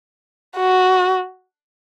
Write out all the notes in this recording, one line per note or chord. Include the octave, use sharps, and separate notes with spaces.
F#4